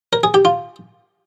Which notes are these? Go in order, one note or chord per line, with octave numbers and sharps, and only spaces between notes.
A#4
G#4
G4
F4